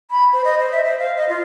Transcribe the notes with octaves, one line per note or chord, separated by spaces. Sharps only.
B5
C5
D#5
C5
E5
C5
F5
D#5
F4